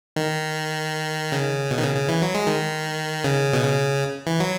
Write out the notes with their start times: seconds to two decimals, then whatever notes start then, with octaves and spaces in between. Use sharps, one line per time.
0.16 D#3
1.32 C#3
1.70 B2
1.78 D#3
1.84 C#3
1.96 C#3
2.09 E3
2.22 F#3
2.34 G#3
2.47 D#3
3.24 C#3
3.53 B2
3.63 C#3
4.27 E3
4.40 F#3